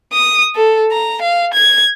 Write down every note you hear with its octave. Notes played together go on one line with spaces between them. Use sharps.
D#6
A4
A#5
F5
G#6